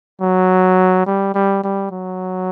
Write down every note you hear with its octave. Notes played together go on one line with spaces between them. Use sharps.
F#3
G3
G3
G3
F#3